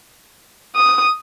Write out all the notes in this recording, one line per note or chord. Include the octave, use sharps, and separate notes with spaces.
D#6